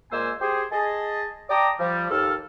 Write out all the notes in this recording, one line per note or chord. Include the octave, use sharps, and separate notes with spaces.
A#2 G#3 A#3 C5 G#5 E6
G4 G#4 C5
G#4 D#5 A5
D5 G5 A5 A#5 D6 D#6
F3 G3
D#2 A4 F6